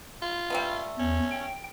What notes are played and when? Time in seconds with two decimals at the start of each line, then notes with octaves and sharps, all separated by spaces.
0.22 F4
0.50 G3 A3 B3
0.99 E2 C#4
1.32 G5